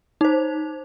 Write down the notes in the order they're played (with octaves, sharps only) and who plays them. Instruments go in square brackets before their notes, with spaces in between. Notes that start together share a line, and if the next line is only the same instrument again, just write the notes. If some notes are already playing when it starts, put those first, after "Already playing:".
[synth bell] D#4 C5